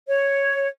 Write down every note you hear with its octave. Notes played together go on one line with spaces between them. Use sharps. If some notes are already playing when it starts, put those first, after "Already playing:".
C#5